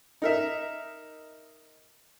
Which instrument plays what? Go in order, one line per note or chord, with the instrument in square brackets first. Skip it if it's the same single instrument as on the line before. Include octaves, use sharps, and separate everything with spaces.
[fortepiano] D#4 A#4 E5